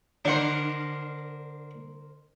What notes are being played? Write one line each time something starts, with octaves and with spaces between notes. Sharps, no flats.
D3 D4 A#4 C5 F#5